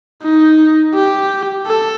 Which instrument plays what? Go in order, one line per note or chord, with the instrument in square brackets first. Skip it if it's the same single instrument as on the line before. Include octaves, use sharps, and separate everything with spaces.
[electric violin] D#4
G4
A4